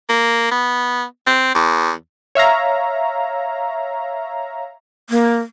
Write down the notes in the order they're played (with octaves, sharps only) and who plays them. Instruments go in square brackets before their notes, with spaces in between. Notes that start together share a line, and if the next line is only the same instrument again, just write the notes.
[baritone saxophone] A#3
B3
C4
E2
[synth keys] C#5 E5 F5 A#5
[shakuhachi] A#3